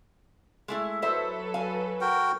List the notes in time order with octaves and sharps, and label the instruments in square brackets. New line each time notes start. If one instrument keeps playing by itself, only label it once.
[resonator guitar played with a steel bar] G#3 A3 E4
[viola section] F#3 A4 B4 [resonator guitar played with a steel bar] E4 C5 E5
[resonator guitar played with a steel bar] F5 G#5
[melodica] F#4 A#4 G5